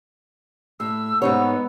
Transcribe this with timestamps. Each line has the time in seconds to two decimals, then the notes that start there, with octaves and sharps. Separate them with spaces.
0.80 A2 E6
1.22 G#2 B3 D#4 C#5 E6